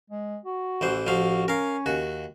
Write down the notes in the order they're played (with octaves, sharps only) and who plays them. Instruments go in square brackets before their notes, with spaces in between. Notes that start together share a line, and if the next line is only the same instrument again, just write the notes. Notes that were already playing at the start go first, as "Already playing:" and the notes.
[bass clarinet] G#3
F#4
[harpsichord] A1 E3 C5
[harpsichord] A1 F3 F5 [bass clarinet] F#4
[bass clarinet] C#4 [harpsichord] A#4 F5
[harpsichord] D#2 F#4